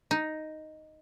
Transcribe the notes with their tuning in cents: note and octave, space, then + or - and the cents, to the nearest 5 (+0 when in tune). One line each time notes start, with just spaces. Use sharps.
D#4 +0